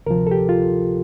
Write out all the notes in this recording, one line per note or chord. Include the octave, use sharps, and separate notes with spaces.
D2 C3 F3 A#4
A4
G4
F4